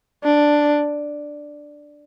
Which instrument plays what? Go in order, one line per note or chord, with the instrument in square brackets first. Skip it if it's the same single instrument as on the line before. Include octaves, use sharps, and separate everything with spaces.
[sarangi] D4